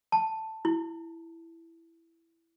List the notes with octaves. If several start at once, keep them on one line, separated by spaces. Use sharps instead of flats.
A5
E4